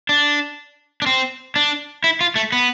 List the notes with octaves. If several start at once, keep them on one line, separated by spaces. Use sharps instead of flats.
D4
D4
C4
D4
E4
F4
A3
B3